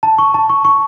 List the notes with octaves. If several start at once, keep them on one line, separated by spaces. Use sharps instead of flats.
A5
C#6
A5
C#6
C#6